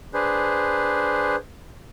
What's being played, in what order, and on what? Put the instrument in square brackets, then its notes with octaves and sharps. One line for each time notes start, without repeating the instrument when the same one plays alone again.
[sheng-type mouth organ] D4 G#4 B4 C5